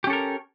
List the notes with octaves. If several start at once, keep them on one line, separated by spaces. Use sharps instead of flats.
C#4 G4 A4 A#4